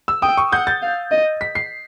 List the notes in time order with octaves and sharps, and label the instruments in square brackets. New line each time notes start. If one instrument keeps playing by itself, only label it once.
[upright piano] E6
[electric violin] G5 [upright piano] D#6
[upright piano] C#6
[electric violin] F#5 [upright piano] G6
[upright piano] A6
[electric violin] F5
D#5
[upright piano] B6
C7